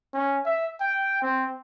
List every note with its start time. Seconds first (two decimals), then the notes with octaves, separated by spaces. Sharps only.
0.14 C#4
0.46 E5
0.80 G5
1.22 C4